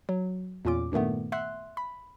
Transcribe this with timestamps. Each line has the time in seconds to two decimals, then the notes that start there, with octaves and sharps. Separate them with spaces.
0.09 F#3
0.65 E2 A#2 C#4 F4 D6
0.92 G2 A#2 D#3 A3 B3
1.32 E5 F#5 C6 F#6
1.77 B5